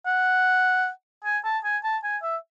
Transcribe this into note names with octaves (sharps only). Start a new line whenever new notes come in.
F#5
G#5
A5
G#5
A5
G#5
E5